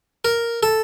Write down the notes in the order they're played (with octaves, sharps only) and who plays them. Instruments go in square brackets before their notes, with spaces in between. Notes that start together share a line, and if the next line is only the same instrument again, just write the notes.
[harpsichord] A#4
A4